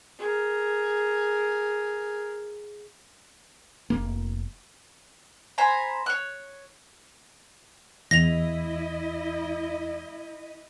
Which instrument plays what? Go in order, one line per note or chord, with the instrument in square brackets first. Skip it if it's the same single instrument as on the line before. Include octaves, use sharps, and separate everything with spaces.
[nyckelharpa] G#4 A#4
[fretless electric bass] F1 A#3
[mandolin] C5 G#5 A#5 B5
C#5 F#6
[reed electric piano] E2 [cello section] E4 D#5 [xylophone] A#6 F7